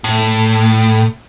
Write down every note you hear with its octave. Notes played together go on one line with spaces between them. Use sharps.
A2